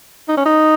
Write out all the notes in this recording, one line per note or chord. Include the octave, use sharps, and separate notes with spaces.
D#4
C#4
D#4